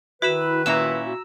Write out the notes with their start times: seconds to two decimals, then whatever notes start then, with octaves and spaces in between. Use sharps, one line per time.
0.22 D#3 E4 F#4 B4 B5 E6
0.66 A#2 C#4 E4 A#5 E6